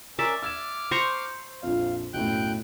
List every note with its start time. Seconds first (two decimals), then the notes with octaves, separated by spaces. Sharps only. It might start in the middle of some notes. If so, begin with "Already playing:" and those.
0.19 C#4 A#4 D5 E5
0.42 D6 E6 F6 G#6 E7
0.91 C5 A#5 C#6
1.63 A#1 F2 F5
2.14 B1 F#2 A2 G5 F#6 G6